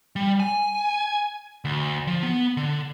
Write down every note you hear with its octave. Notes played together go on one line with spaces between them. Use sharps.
G3
G#5
D2
F3
B3
D3